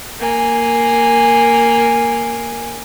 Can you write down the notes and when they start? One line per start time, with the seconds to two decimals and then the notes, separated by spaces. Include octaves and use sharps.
0.20 A#3 G#5